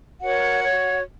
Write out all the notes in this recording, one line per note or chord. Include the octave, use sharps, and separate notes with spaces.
F#4 A#4 C#5 F#5
F#4 C#5